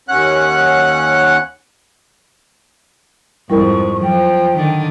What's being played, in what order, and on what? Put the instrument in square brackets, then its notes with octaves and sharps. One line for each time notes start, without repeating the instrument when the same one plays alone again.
[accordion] D#2 C#4 F#5 F#6
[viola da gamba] F2 G#2 [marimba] G3 E4 A#4 [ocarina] C#6
[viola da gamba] F3 [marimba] F#3 [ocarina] G5
[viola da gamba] D3 D#3 D4